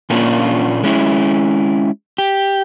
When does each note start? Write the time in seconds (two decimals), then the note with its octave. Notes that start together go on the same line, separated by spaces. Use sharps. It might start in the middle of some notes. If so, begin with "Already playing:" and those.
0.10 A#2 A3 A#3 C#4 D4 F4
0.83 G#3 C#4 E4
2.18 G4